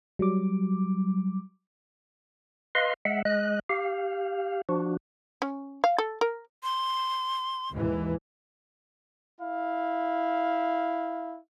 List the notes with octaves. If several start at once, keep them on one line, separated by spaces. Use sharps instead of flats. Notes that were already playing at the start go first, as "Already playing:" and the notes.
F#3 G3 D6
B4 D#5 F5 C6
G#3 E5 F#5
G#3 D#5 F#6
G4 F5
F3 D4 F#4
C#4
F5
A4
A#4
C6
D#2 G#2 E3
E4 F5